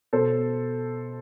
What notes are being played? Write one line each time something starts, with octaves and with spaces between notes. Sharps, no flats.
B2 A4 C5